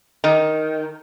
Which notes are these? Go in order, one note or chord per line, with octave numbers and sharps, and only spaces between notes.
D#3